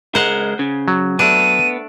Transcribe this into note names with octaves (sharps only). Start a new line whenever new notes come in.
C#2 G#3 A#4 C5 F#5
C#3
F#3
A3 B3 D4 D#7